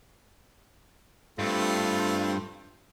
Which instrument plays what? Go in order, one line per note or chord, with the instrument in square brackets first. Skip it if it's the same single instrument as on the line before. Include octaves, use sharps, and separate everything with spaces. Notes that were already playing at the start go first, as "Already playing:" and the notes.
[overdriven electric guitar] G2 [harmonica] A3 C4 F4